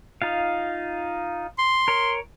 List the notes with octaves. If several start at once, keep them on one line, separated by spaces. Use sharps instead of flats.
D#4 F4 F5
C6
A#4 C#5